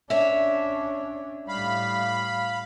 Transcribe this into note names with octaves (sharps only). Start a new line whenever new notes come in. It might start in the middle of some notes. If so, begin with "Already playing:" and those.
C#4 D4 C#5 E5
A2 G3 F5 B5